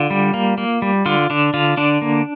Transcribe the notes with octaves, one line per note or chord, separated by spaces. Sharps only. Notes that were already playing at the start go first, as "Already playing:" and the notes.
Already playing: D3 F4
G3
A#3
A#3
G3
D3 F4
D3 D4
D3 F4
D3 D4
A#3